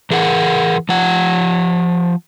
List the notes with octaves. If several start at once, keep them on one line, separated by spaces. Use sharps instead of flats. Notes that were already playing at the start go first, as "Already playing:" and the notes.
E3 G#4 A#4 F#5
F3 F#5